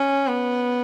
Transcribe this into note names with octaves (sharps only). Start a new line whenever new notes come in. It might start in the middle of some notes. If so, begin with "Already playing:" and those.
Already playing: C#4
B3